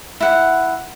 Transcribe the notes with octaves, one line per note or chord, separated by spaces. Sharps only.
E4 F#5